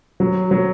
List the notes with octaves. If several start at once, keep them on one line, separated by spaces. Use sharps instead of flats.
F#3
F#3